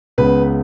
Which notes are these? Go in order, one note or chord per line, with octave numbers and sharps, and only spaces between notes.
C#2 C#3 B3 B4